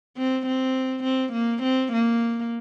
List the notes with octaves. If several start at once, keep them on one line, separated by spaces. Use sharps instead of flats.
C4
C4
C4
A#3
C4
A#3